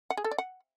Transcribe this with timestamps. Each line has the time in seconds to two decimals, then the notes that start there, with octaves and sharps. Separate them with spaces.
0.10 F#5
0.17 G#4
0.24 A4
0.31 D5
0.38 F#5